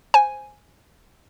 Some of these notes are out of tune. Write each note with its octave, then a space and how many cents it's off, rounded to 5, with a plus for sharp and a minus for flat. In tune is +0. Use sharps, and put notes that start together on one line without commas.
C5 +0 G#5 +0